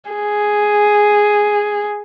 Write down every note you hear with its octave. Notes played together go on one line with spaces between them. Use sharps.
G#4